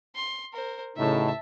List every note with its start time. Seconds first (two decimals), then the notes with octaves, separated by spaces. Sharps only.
0.16 C6
0.53 A#4 C5
0.96 A1 A2 C#3 D#4 E5 A5